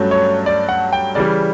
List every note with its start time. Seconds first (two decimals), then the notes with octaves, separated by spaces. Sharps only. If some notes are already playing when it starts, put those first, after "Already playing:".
Already playing: G2 F#3 A3 C#4
0.11 C#5
0.46 D5
0.69 F#5
0.93 G5
1.15 C#3 E3 G3 D5